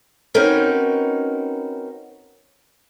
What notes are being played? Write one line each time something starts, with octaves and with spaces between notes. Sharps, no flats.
C4 C#4 D#4 F#4 A#4 B4